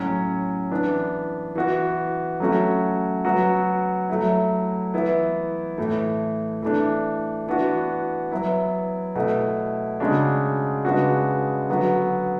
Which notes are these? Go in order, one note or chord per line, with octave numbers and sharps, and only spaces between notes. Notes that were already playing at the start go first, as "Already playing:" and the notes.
Already playing: A2 F#3 C#4
E3 B3 D4
E3 B3 F#4
F#3 A3 C#4 F#4
F#3 B3 F#4
F#3 A3 E4
E3 B3 E4
A2 E3 A3
E3 A3 D4
E3 B3 D4 F#4
F#3 B3 E4
B2 A3 E4
C#3 G#3 D4 F#4
C#3 G#3 B3 D4 F#4
D3 F#3 B3 F#4